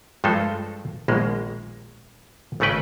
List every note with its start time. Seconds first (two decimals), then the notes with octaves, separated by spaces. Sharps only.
0.24 G2 F3 G#3 A3 A4 C5
1.08 A#1 B2 D#3 G#3 A#3
2.60 G#1 C#3 A3 C#4 B4 G5